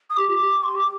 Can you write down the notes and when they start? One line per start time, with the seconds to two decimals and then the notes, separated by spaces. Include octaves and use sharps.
0.10 D#6
0.17 G4 D6
0.29 F4
0.41 G4
0.64 C6
0.75 D6